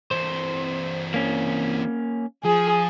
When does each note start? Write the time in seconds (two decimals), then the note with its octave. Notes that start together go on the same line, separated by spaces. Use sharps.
0.11 E3 C4 C5
1.14 A#3 C#4
2.44 F3 G#4